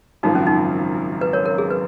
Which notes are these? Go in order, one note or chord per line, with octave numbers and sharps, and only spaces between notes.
G#1 F#2 C#3 F3 D#4
C#4
D#4
B4
A#4 C#5
A#4
G#4
B4